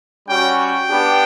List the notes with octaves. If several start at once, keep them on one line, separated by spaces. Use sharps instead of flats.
G3 C#4 F#4 G5
G5
B3 D4 G4